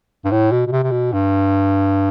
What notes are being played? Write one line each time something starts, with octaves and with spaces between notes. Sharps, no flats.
G2
A2
B2
B2
C3
C3
B2
G2